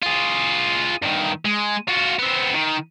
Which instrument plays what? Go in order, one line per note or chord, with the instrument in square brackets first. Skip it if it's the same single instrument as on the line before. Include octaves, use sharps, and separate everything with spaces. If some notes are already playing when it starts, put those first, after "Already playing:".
[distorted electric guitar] F4 G#4
G2 D#3
G#3
F4 F#4
B3 C4
D#3